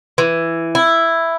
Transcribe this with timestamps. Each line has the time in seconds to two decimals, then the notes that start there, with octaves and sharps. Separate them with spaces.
0.18 E3
0.75 E4